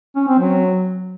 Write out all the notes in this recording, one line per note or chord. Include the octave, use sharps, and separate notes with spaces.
C#4
C4
F#3